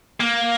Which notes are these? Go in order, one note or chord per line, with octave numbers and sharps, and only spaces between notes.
A#3